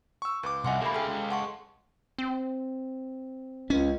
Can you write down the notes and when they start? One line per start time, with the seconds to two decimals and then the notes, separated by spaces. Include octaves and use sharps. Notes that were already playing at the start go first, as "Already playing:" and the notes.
0.22 C#6 E6
0.43 C#2 B4 D6
0.64 C2 D#5 E5 F#5 G#5 C6
0.81 A3 A#3 G4 B5
0.94 G#3 A4 F5 G5
1.31 F#5 A5 C6 C#6
2.18 C4
3.70 C#2 C#4